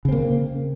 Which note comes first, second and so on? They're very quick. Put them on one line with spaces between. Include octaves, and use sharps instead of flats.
C#3 C4 A#3